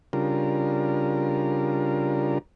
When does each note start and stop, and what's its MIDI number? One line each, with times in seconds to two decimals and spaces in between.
0.13 2.38 49
0.13 2.38 55
0.13 2.38 62
0.13 2.38 65
0.13 2.38 70